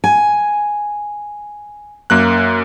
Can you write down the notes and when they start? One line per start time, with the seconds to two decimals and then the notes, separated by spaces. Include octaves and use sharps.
0.04 G#5
2.10 F#2 A#3 F#6